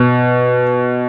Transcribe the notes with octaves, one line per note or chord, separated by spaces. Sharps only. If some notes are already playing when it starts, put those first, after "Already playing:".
Already playing: B2